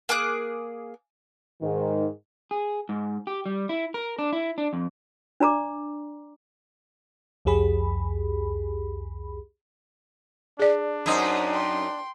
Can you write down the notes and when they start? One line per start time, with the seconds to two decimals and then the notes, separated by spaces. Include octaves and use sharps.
0.09 A#3 G#4 D6 F#6
1.62 G#2 D#3
2.51 G#4
2.89 G#2
3.27 G4
3.46 G3
3.69 E4
3.94 A#4
4.19 D4
4.33 E4
4.58 D4
4.73 F2
5.40 D4 D5 A#5 D6
7.45 C2 F2 G4 G#4 B5
10.59 D4 G#4 D5
11.06 F#2 D#4 C5 F#5
11.51 G5 C6